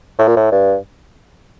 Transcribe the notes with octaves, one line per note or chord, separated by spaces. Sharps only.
A2
A#2
A2
G2